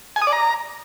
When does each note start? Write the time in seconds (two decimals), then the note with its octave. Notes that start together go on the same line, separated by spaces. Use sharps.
0.16 G#5
0.22 D#6
0.27 D5
0.33 A#5